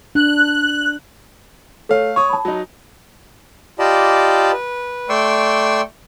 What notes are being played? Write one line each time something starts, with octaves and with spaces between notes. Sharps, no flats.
D4 F#6
A3 A4 C#5 F5
C#5 C#6 D#6
A5 B5
F#3 D#4
F4 G4 D5 D#5 A5 B5
B4
A3 D5 G5 C6 C#6 E6